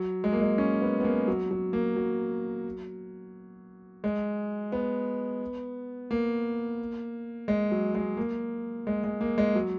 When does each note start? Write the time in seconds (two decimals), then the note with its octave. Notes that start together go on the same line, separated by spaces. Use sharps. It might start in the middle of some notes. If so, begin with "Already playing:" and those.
Already playing: F#3
0.24 G#3
0.32 A#3
0.41 G#3
0.58 C#4
0.82 B3
1.00 B3
1.04 A#3
1.28 F#3
1.51 F#3
1.73 A#3
1.96 F#3
4.04 G#3
4.72 B3
6.11 A#3
7.48 G#3
7.71 F#3
7.95 G#3
8.17 A#3
8.87 G#3
9.04 G#3
9.21 A#3
9.38 G#3
9.55 F#3